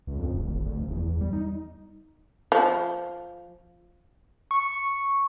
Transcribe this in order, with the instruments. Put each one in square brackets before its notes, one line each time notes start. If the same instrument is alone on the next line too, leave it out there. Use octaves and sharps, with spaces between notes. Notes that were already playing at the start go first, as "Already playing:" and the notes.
[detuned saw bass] C#2
F2
D1
G#1
D2
F1
E2
E2
G3
D#4
[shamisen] F3
[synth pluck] C#6